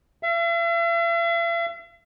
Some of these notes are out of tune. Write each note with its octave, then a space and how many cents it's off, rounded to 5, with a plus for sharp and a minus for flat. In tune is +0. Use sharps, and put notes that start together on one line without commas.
E5 +45